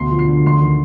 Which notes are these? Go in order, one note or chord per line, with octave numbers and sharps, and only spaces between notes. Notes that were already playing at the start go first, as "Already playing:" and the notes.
Already playing: D2 B2 C6 C7
F3
C7
D3
D2 C6 C7
D#3